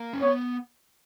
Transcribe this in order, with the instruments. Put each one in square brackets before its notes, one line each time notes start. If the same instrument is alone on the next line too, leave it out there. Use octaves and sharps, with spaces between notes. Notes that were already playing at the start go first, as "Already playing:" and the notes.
Already playing: [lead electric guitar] A#3
C#4
[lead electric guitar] B3 [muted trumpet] C#5